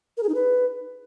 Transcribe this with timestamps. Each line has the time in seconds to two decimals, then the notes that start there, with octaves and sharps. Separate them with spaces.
0.17 A#4
0.23 G#4
0.29 D#4
0.35 B4